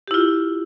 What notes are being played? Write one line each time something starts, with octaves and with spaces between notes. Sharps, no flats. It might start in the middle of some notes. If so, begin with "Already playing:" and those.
E4 F4 G4